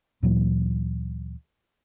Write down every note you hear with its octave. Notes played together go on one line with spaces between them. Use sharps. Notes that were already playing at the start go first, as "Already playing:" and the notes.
D2 A#2 E3 F#3